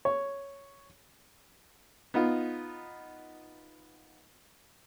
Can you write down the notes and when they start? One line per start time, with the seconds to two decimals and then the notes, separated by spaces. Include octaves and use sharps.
0.05 C#5
2.14 B3 D#4 F4